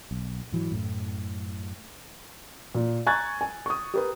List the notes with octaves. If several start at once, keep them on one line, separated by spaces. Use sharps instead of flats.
B1
G#2 E3 F#3
F#2 A2
A#2
G#5 A#5 C#6 F#6 G#6 A6
G#5
C#6 D#6
G4 A#4 B4